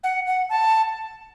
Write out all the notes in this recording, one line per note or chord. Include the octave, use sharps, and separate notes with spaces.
F#5
F#5
A5